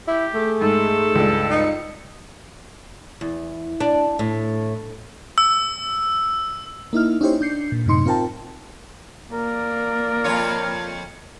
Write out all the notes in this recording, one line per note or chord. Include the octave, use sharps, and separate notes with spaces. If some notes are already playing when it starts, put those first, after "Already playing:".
E4 G4
A3 G#4
G#2 A4
C#2 G2
D#4 C#7
E2
D4
A2
E6
A#3 D#4 E4 F6
C#4 D#4 E4 G4 C5 C#5
D4 G6 C7 C#7
A#2
F#2 A2 C3 D#4 C6 C#7
C4 F4 A#4 G5 A5
A#3 A#4 D5
F2 F4 C#5